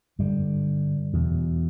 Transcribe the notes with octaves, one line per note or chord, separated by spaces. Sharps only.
G2 D3 G3
E2 B2